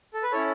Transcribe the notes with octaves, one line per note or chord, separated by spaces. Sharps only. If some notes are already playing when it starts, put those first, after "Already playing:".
A4
B4
C#4 E4 A4 C#5